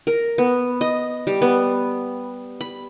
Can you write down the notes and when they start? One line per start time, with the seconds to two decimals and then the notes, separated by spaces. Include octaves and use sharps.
0.07 A#4
0.38 B3
0.81 D#5
1.27 G3
1.42 B3
2.61 B5